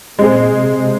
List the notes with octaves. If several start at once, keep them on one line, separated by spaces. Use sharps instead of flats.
A#2 G#3 C4 G#4
C3